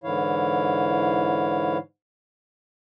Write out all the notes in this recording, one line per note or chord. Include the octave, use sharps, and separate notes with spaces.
G#2 D3 E3 E4 C#5 F5